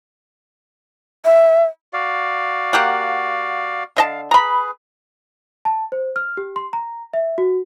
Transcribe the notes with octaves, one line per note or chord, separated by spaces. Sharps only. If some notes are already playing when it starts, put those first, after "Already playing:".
E5
F#4 D5 F5
A#3 G4 F#5
D3 D#5 F5 A5
G#4 B4 A#5 B5
A5
C5
F6
G4
C6
A#5
E5
F#4